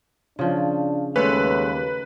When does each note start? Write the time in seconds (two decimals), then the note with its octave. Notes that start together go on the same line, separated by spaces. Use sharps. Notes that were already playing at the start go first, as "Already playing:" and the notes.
0.39 C#3 F3 D4
1.16 D#2 G#3 A3 C#4 B4